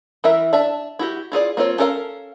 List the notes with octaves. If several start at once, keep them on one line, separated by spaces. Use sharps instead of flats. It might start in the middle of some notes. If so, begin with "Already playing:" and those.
E3 E4 A#4 E5
D4 E5 A5
E4 F#4 G4
E4 F4 G#4 D5
A#3 C4 F4 C#5
C#4 A4 A#4 C#5 F5